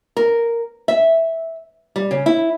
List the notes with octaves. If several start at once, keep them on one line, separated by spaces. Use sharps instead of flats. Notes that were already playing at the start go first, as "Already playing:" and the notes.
A#4
E5
G3
C#3
E4